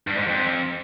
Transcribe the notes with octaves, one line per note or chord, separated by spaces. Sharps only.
G2
G#2
F2